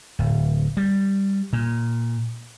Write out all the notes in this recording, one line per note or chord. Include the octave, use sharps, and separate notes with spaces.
D1
G3
A#2